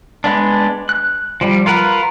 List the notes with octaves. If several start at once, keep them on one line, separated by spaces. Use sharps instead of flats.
G#3 B3 D4
F#6
F3 G3
F4 A#4 B4 F#5